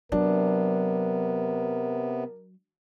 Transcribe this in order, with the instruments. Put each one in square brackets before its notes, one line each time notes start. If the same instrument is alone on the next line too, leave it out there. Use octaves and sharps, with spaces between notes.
[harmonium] C3 B3 [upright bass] F#3 [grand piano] D4 [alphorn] A#4